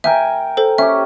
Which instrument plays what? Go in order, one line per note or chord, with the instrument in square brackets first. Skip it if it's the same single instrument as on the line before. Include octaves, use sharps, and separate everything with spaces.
[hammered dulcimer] A#4 G5 G#5 [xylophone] E5
[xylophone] A4 C5
[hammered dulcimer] C#4 G4 [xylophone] E5